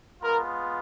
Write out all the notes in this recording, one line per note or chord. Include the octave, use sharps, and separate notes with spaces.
G#3 B3 F4 A#4